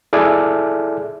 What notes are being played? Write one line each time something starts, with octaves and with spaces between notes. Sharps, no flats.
E4 G#4 A4 D5 E5